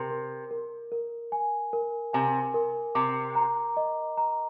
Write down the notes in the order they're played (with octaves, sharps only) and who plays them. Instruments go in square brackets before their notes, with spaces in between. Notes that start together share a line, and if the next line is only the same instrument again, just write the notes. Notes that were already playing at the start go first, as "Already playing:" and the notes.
Already playing: [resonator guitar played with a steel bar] C3 [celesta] A#4
[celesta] A#4
A#4
A#4
G#5
A#4
[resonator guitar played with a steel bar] C3 [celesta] G#5
[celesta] A#4
[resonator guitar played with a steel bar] C3 [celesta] D6
[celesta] A#5
D#5
A#5